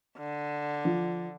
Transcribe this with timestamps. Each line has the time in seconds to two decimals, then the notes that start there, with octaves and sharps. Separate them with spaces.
0.18 D3
0.85 F3